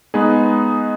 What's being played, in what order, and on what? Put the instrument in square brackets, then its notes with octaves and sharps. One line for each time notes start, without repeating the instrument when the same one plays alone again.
[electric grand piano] G#3 B3 D#4 G#4 B4